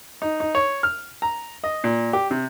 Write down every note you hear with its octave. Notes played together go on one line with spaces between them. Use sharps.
D#4
D#4
C#5
F6
A#5
D#5
A#2
G4
C3